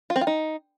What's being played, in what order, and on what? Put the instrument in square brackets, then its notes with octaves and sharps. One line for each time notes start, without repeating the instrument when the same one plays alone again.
[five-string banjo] F4
C4
F4
D#4